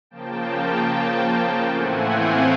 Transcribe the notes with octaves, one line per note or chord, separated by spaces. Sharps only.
C#3 F3 A#3 G5 A5
A2 E3 A3 C4 F#5 G#5
F5 G5